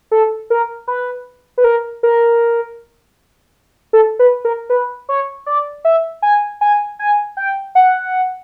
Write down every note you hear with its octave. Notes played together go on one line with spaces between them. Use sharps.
A4
A#4
B4
B4
A#4
A#4
A4
B4
A#4
B4
C#5
D5
E5
G#5
G#5
G#5
G5
F#5